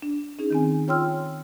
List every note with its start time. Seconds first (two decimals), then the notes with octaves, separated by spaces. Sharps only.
0.02 D4
0.39 C#4 D#4 G#4
0.50 D#3 C4 G#5
0.88 F4 C#5 G5 C6 E6 F6